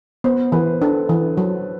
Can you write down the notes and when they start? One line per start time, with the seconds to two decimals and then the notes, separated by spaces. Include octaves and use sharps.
0.24 B3 C5
0.52 E3 B4
0.82 D4 A4
1.09 E3
1.37 F#3